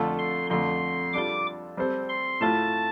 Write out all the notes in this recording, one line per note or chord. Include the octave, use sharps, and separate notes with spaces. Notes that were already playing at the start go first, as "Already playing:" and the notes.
Already playing: F2 D3 A3 F4 A4
C6
F2 D3 A3 C6
G3 D4 F4 A4 D6
G3 C4 A4 C5
C6
A2 A3 F4 A5